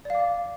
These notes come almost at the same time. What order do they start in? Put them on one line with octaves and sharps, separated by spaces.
D5 F5 D6